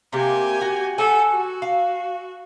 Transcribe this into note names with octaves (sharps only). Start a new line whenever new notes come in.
C3 A3 A#3 G4 G#5
F#4
G4 A4 F#5 G#5
F#4
F5